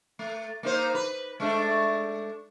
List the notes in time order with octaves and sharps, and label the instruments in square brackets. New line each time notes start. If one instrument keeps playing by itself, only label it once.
[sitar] A3
A#3 D#4 C5
B4
G#3 A3 D4